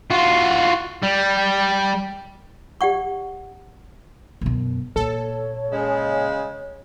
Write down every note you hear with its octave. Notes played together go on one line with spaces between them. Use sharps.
F4 F#4
G3
G4 D5 F#5 C#6
F#2 B2
A#2 A4 C#5
C#3 G#3